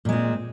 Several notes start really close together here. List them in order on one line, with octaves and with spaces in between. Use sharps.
A#2 G#3 C4